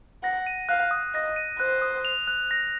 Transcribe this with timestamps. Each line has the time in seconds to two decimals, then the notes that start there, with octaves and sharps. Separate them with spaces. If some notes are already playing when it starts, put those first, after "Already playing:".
0.23 F#5 A#6
0.47 D#7
0.69 F5 F#6
0.91 D#6
1.14 D#5 A#6
1.36 D#7
1.60 C5 F#6
1.82 D#6
2.05 F7
2.27 F#6
2.51 A#6